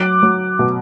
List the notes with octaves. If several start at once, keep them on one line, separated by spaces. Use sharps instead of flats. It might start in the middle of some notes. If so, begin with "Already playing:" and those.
Already playing: F#3 D6 F#6
F#3
B2